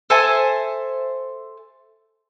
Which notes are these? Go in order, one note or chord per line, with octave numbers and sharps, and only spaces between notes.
A4 C5 E5 G#5